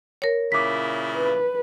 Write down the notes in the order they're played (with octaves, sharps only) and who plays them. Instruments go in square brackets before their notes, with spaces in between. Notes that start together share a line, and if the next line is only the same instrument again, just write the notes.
[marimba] A#4 C#5
[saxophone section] A#2 C#3 E4 [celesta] D6 B6
[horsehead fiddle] B4